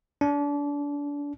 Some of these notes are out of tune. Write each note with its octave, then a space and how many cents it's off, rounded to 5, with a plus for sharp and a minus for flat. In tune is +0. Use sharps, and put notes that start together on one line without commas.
D4 -30